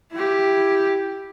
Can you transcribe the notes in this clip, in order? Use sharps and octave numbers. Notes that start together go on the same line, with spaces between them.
E4 G4